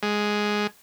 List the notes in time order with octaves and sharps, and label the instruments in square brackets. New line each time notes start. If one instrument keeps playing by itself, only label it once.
[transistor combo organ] G#3